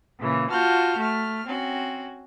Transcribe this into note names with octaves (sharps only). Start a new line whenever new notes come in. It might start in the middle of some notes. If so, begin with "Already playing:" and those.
A#2 C#3 E3
F4 F#4 A5 F6 G6
A3 F6
C4 C#4 F#4